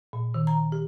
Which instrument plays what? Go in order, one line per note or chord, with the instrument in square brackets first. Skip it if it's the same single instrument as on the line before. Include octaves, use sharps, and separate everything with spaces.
[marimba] A#2
D#3
A#5
G4